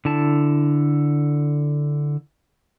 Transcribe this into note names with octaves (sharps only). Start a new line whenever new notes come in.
D3 E4 A5